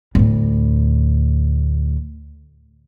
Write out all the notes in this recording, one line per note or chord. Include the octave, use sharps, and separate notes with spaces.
D2 A2